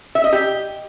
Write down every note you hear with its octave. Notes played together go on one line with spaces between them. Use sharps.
E5
D#5
G4